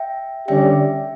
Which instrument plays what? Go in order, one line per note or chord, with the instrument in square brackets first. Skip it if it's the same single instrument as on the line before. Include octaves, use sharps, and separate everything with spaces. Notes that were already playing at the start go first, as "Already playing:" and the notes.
Already playing: [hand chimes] E5 G5
[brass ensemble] D3 G3 C#4 G4 D5 [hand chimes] E5 G5